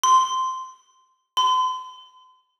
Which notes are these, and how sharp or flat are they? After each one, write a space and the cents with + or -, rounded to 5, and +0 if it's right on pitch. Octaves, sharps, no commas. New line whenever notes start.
C6 -15
C6 -45